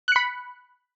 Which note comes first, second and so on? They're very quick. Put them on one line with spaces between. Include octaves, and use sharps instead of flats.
F#6 C#7 B5